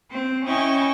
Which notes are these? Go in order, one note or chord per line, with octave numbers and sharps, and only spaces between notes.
C4
C#4 E4 D#5 G5 G#5 C#6